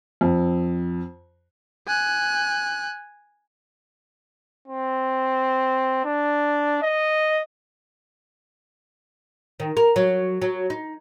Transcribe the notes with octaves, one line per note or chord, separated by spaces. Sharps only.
F2
G#5 F#6
C4
D4
D#5
D#3
A#4
F#3
F#3
D#4